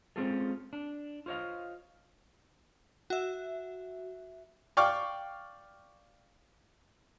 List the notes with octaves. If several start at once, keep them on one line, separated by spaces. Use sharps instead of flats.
G#3 C4 C#4 F4 G#4 A4
D4
F4 C5 C#5 D#5 F5
F#4 E5
D5 F5 G5 C#6 D6 F6